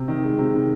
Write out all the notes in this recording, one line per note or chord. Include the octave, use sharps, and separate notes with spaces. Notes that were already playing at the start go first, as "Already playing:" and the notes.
Already playing: C3
D#3
G#3
C3
D#3